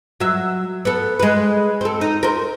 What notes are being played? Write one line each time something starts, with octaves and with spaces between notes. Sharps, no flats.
F#3 E5
B3 A4
G#3 B4
C4 A4
D#4
A#4 C5